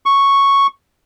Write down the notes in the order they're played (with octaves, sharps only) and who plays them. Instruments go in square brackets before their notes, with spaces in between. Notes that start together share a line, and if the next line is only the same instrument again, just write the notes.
[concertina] C#6